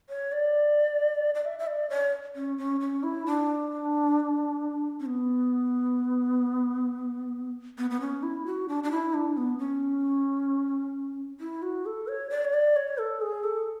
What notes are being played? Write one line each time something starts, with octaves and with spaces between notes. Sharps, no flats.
C#5
D5
D5
E5
E5
D5
C#5
C#4
C#4
C#4
E4
D4
C#4
B3
B3
B3
C#4
E4
F#4
D4
D4
E4
D4
B3
C#4
E4
F#4
A4
C#5
D5
C#5
D5
C#5
A4
G#4
A4